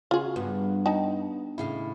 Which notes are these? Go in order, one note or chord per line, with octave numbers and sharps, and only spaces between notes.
C#3 F4 F#4 G#4
G2 B3
D#4 G5 A5
D#2 A2 C#3 E4 F5